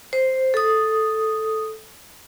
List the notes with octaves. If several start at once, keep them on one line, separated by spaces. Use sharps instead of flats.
C5
A4 D#6